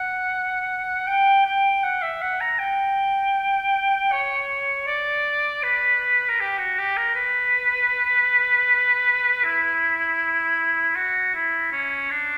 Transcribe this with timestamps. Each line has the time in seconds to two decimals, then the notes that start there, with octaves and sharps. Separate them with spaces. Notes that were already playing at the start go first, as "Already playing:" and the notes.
Already playing: F#5
1.07 G5
1.45 G5
1.84 F#5
2.02 E5
2.21 F#5
2.40 A#5
2.59 G5
4.12 C#5
4.87 D5
5.63 B4
6.29 A#4
6.40 G4
6.58 F#4
6.78 G4
6.97 A#4
7.15 B4
9.44 E4
10.96 F#4
11.34 E4
11.72 C#4
12.11 D4